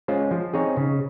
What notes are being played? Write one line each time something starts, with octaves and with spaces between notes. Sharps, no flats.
G#3 C#4 F4 C5
F3
C4 D#4 G#4 C#5
C#3